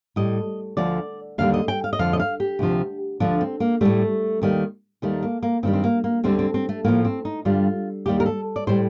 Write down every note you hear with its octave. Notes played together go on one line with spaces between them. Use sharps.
A2 G3 D#5
D2 D3 F3 D5
D#2 D3 G3 F5
D#5
G5
F5
D#5
F2 D3 F3 F5
D#5
F5
G4
D2 C3 F3
D2 D3 F3 D4
C4
A#3
A2 G3 A3
D#2 D#3 G3
D#2 D#3 G3 A3
A#3
A#3
G2 D#3 G3 C4
C4
A#3
A#3
D2 D3 G3 C4
C4
C4
A3
A2 F3 A#3
C4
D#4
G2 D3 G3 F4
D#2 D#3 G3 G4
A#4
A4
D5
A2 G3 C5